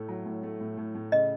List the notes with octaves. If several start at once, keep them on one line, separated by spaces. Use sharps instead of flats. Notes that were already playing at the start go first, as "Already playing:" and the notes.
Already playing: A2 A3
F#3
A2
A3
A2
A2
A2
C#3 D#5